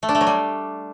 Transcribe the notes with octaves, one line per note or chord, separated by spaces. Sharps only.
A3
D4
A3
F#3
G3